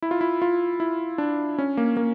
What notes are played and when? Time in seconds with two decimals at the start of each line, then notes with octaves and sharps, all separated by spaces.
0.02 E4
0.11 F4
0.21 E4
0.42 F4
0.80 E4
1.18 D4
1.58 C#4
1.77 A#3
1.97 A#3